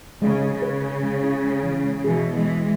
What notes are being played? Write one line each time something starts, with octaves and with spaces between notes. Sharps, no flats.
C#3 G#3
G#4
C#3
B4
B4
G#3
E4
G#3
E3
G#3
B2 E3 G#4
E4
E3 G#3
G#4